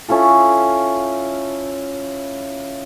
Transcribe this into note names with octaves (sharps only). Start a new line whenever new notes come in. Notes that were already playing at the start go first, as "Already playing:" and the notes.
C#4 E4 F4 A4